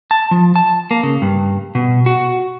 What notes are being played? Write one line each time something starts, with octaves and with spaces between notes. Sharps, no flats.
A5
F3
A5
A#3
C#3
G2
B2
F#4